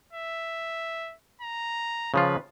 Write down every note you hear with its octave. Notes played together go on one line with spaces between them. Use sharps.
E5
A#5
C#3 F3 F4 B4